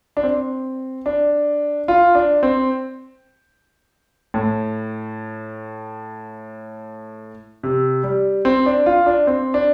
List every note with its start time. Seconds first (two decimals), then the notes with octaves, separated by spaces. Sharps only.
0.17 D4
0.23 C4
1.06 D4
1.88 F4
2.15 D4
2.43 C4
4.34 A2
7.63 C3
8.03 G3
8.45 C4
8.66 D4
8.86 F4
9.06 D4
9.27 C4
9.54 D4